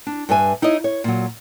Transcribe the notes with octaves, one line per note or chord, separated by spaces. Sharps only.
D4
G2 B4 E5 G#5
D#4 E4 C#5 D#5
C#5
A#2 F#3